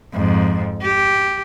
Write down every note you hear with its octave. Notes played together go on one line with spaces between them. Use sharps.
F2 G#2
G4